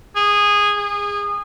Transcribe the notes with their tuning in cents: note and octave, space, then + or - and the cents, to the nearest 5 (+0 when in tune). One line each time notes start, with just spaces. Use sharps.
G#4 -15
G#4 -25